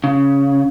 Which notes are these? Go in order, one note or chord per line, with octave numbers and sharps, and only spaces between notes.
C#3